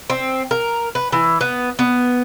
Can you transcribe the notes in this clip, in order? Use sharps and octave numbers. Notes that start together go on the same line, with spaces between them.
C4
A#4
B4
E3
B3
B3